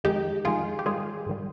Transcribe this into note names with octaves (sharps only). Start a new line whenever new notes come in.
F2 D#3 G#3 D#4 G4
F2 D#3 G#3 F4 G#4
G4
G#2 D#3 G3 F4 G#4
G#2 D#3 G3